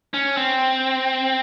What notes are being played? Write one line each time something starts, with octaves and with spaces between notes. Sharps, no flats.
C#4
C4